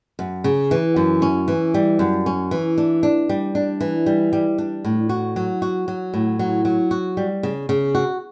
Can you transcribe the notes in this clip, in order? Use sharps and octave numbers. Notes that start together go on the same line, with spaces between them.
F#2
C#3
E3
F#2
C#4
E3
G3
F#2
C#4
E3
D4
D4
G3
D4
E3
G3
G3
D4
A2
F#4
F#3
F#4
F#3
A2
F#3
F#3
F#4
G3
C#3
C#3
F#4